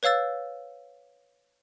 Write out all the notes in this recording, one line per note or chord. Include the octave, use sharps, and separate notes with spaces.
B4 C#5 F5 E6 A6